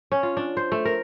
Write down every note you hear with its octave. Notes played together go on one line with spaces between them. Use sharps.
C#4
F4
D4
C5
A3
A#4